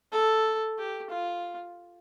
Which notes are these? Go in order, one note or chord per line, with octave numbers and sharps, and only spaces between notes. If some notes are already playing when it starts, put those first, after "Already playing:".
A4
G4
F4